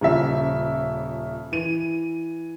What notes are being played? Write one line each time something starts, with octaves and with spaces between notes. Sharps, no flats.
D#1 C#3 F3 E5
E3 D#7